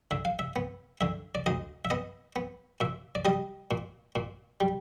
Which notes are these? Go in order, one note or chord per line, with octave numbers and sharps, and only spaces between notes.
D3 E5
F5
E5
B3
D3 E5
D5
D2 D#5
E5
B3 D#5
B3
A#2 E5
D5
G3 D#5
A#2
A#2
G3